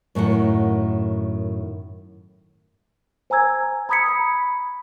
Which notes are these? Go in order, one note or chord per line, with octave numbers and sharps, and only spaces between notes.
F#2 A2 D#3 F#5
C5 G#5 A#5 E6 G#6
A#5 B5 D#6 G#6 B6 C#7
B5